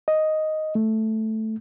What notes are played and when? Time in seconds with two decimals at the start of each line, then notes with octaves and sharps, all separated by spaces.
0.08 D#5
0.75 A3